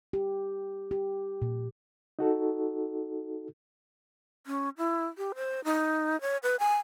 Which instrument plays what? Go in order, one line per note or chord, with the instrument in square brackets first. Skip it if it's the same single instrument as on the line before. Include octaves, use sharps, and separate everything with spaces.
[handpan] G4
G4
A#2
[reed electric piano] D#4 F#4 A4
[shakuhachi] C#4
E4
G4
C5
D#4
C#5
B4
G#5